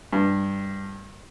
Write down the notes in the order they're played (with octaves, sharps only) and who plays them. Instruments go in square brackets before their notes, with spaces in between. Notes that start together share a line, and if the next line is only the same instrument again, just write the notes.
[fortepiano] G2